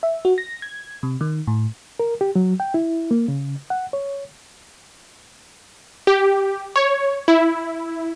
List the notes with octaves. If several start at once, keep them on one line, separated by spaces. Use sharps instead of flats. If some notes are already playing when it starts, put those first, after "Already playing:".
E5
F#4
A#6
G#6
C3
D#3
A2
A#4
G4
F#3
G5
E4
A#3
C#3
F#5
C#5
G4
C#5
E4